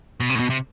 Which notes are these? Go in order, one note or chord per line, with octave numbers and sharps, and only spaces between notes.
B2
C3
A2
B2
C3